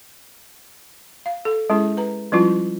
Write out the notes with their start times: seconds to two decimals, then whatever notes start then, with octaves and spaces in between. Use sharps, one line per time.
1.26 F5
1.45 A4
1.70 G#3 C#4 E4 G#4
1.97 B4 A#5
2.32 F3 G3 C#4 E4 F4